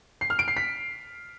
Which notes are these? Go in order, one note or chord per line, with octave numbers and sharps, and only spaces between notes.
C7
F6
D7
C7
B6